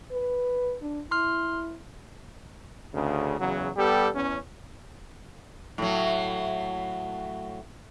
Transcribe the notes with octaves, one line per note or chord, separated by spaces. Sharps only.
B4
D4
E4 C6 F6
D2 C#3
E2 C#3 F#3
G3 B3 G4 A4
E2 C#4
A2 F#3